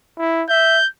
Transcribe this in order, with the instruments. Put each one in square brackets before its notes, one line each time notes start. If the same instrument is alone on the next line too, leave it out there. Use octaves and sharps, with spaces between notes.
[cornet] E4
[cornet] E5 [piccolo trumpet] G6